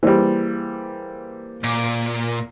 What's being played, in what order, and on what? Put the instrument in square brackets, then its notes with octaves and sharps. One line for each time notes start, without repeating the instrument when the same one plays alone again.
[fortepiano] E3 G3 [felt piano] A#3 G#4 C5
[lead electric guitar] A#2